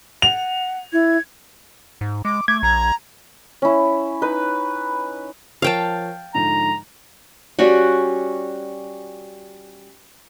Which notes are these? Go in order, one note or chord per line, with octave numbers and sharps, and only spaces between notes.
F#5 F7
E4 G#6
G#2
G#3 D6
A3 D6 G#6
A#1 A#5
C#4 E4
D#4 B4
F3 A#4 C#5 F5 G5 A5
G#2 D3 F3 A#5
G3 C#4 F#4